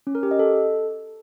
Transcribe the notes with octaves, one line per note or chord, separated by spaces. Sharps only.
C#4
A#4
G4
D#5
A4